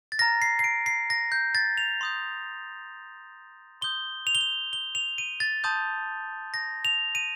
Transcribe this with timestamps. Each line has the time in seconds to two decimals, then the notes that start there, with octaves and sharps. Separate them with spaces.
0.12 A6
0.19 A#5 F6 A#6
0.42 C7
0.59 C7
0.64 D7
0.86 C7
1.10 A#6
1.32 G6
1.55 A6
1.77 F7
2.01 C6 D#6 G6
3.81 C6 D#6 G6 G7
4.27 F7
4.35 G7
4.41 F7
4.73 G7
4.95 F7
5.18 D#7
5.40 A6
5.64 A5 C6 D#6 G6
6.54 A#6
6.85 F7
7.15 D#7